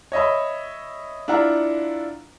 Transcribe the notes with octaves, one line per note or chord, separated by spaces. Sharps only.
C#5 D#5 E5 B5
D4 E4 F4 F#5 A#5